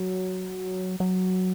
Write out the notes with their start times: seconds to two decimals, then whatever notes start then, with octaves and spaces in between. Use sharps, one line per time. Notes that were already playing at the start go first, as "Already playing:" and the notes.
Already playing: F#3
1.00 F#3